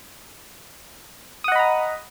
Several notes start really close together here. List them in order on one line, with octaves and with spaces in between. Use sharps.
D#6 F#5 D#5 B5 A#5